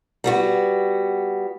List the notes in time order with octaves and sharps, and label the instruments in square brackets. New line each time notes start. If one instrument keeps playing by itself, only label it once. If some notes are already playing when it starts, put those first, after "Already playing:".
[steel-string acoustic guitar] G3 B3 F#4